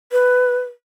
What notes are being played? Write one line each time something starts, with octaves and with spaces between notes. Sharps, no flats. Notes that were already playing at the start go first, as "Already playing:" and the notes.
B4